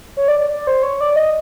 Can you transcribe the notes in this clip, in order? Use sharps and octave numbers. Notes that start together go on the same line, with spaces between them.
C#5
D5
D5
D5
C5
C#5
D5
D#5